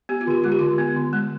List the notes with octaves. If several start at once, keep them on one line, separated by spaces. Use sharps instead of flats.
B3 G4
F4
D3 G4
G#3 F4
G4
D3 F4
B3
D3
G#3